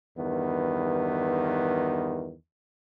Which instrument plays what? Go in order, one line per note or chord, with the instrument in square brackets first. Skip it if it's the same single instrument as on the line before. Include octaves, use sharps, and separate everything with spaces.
[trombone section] E2 G2 D#3 B3